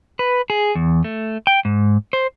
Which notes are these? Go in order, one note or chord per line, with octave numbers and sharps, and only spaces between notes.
B4
G#4
E2
A3
G5
G#2
C5